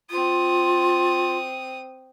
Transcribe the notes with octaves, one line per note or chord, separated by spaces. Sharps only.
C4 F4 D#6